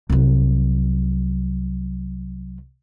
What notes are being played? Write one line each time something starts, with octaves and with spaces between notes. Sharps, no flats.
C2 F#3